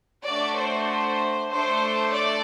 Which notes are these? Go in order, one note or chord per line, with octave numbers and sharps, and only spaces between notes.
A3 D4 F#4 D5
C5
A3 D4 A4 C5
D5